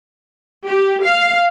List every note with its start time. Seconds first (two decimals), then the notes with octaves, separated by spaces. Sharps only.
0.66 G4
1.06 F5